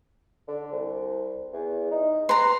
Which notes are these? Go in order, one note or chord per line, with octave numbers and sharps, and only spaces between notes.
D3
C2
E2
D#4
B4 A#5 C6